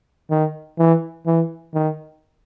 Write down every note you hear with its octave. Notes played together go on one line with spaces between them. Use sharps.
D#3
E3
E3
D#3